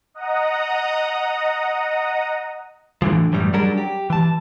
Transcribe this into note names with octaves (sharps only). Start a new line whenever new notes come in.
D#5 F#5 A#5 D#6
A2 D3 E3 F3
F#2 A2 E3 G3
F#3 G3 C#4 D4 G#4 A#4
G4
E3 A5